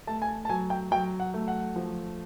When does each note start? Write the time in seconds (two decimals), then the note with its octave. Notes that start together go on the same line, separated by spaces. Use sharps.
0.07 A3 A5
0.22 G#5
0.28 A5
0.45 A5
0.49 F#3 G#5
0.70 G5
0.91 F#3 G5
1.20 F#5
1.34 A3
1.48 F#5
1.76 F3